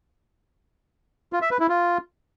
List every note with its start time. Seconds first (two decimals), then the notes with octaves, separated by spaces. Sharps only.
1.33 F4
1.42 E5
1.51 B4
1.60 E4
1.69 F4